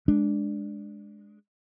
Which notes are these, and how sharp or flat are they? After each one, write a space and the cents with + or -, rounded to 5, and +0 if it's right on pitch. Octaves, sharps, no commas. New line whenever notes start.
G#3 +0 D4 -5